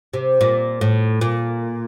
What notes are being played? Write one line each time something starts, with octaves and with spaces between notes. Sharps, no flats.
C3
A#2
A2
A#2